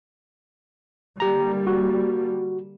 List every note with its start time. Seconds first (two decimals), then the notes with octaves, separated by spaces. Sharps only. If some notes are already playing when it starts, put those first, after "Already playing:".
1.20 D3 G3 A#3 G4 A#5
1.67 F#4